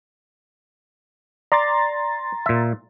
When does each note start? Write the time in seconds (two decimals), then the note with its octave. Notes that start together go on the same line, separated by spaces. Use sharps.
1.52 D5 A#5 C6 A6
2.46 A#2 E5